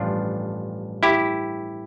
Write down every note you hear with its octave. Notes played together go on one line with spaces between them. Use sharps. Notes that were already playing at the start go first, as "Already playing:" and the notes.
Already playing: A1 G2 F3 D4 F4
E4 G4